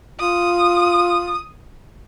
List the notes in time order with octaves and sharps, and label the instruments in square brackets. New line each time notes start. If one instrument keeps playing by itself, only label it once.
[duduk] F4 [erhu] D#6